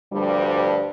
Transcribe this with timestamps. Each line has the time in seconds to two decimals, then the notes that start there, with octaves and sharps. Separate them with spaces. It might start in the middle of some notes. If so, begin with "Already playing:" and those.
0.12 D2 G2 F3 G3